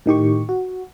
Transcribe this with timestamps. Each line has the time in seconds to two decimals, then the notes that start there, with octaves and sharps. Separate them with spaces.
0.06 A2 D#3 G4 C#6
0.49 F#4